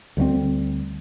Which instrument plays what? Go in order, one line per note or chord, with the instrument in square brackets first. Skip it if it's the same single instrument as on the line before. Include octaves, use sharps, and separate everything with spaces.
[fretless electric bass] D2 G3 G#3 C4